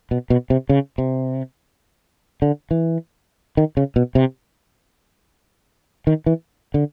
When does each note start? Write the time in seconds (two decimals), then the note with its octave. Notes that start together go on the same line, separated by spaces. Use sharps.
0.11 B2
0.30 B2
0.50 C3
0.69 C#3
0.98 C3
2.42 D3
2.71 E3
3.57 D#3
3.77 C#3
3.96 B2
4.15 C3
6.07 D#3
6.26 E3
6.74 D3